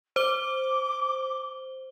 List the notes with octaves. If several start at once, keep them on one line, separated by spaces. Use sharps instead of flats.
C5 D6 G7